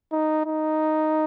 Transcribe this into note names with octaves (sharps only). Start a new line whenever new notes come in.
D#4
D#4